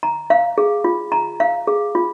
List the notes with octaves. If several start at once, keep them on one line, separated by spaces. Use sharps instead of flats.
A#5
F5
G#4
F4
A#5
F5
G#4
F4